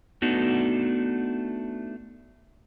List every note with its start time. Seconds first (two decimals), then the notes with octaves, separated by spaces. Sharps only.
0.22 A3 B3 D4 D#4 F#4